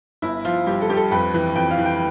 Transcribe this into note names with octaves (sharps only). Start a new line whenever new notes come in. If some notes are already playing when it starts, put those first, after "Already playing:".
G1 E4
F3 F4
G2 G4
A4
G2 G4
A4
F2 B4
E3
F2 G5
F5
E3
G5